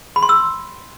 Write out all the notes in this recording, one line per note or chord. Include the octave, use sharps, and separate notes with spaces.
B5
C6
E6